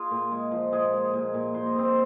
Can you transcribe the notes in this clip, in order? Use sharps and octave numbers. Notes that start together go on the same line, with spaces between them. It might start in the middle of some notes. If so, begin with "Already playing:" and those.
Already playing: F4 G#4
A#2
G#3
F3
A#2 G#3 G#4
G#3
A#2
A#2
A#2 C5
D#5
A#2 C4 C5